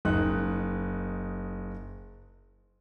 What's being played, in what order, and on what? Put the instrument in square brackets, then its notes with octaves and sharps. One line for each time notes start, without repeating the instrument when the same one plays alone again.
[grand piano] F#1 D#4 F#6